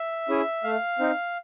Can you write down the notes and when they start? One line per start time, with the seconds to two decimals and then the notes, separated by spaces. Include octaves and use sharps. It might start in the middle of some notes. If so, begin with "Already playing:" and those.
Already playing: E5
0.29 C#4 E4 G#4
0.64 A3 F5
0.99 C4 D#4